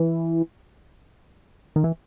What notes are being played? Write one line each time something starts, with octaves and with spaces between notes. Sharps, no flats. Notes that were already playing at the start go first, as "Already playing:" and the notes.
Already playing: E3
D#3
E3